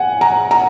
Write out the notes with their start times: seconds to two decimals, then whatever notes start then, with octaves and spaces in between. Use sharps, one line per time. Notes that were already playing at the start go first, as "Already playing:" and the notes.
Already playing: F#5 G#5
0.21 A#5
0.51 A#5